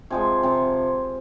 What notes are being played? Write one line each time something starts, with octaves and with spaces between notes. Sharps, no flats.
C3 F3 G#3 G#5
C3 F3